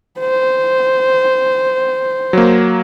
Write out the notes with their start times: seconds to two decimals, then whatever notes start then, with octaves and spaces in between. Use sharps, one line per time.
0.20 C5
2.33 F#3 A#3